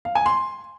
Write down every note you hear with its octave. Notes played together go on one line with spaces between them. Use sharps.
F5
G#5
C6